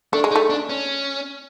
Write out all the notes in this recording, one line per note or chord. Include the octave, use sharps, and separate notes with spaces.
A3 D4
G#3
D#4
A3
D4
C#4